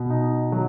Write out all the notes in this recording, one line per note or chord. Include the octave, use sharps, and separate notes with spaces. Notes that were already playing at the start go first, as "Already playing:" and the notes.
Already playing: B2
D#4
F#3